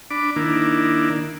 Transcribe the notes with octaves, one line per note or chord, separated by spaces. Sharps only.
D4 B5 D6
D#3 A#3 D4 E4